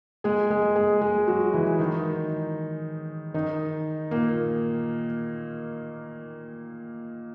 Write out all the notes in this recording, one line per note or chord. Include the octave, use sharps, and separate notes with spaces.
G#3 G#4
G#3 G#4
G#3 G#4
G#3 G#4
F#3 F#4
E3 E4
D#3 D#4
D#3 D#4
A#2 A#3